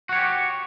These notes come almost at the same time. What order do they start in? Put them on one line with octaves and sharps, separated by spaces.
F#4 C#5 G4